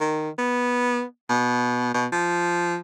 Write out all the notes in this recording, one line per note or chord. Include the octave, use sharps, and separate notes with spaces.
D#3
B3
B2
B2
F3